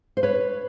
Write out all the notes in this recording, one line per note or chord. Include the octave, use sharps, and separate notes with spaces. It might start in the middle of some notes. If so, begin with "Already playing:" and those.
C5
B4 C#5